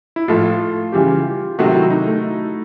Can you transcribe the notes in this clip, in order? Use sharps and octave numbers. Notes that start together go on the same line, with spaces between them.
E4
A2 F3 A3 F4
C#3 E3 G3 G4
C3 D#3 F#3 A3 F#4
E4
D#4
A3